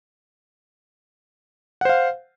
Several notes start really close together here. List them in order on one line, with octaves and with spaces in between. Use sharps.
F#5 C5 F5